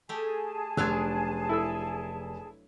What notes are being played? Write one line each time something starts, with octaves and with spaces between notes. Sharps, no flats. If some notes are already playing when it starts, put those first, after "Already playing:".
A3 G4 G#4 G#5 A5
F1 F#3 D4 F4 E6 F#6 G#6
E4 A4 E6